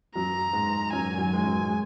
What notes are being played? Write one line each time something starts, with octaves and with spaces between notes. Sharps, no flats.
F#2 F#3 A#5
G#2 G#3
F#2 F#3 G#5
D#3
F#2 F#3
G#3
F#2 F#3
G#3